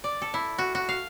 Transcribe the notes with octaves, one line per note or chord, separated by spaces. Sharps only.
D5
A4
E4
F#4
F#4
F5